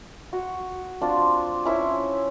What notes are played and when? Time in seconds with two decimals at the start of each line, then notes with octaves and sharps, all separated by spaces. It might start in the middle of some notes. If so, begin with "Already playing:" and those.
0.33 F#4
1.02 C4 D4 F4
1.65 C#4 E4 C5 C#5